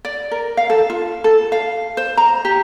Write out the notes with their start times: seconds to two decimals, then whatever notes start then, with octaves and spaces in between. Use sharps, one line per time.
0.05 D5
0.31 A#4
0.57 F5
0.70 A4
0.90 F4
1.24 A4
1.52 F5
1.97 C5
2.17 A#5
2.45 G4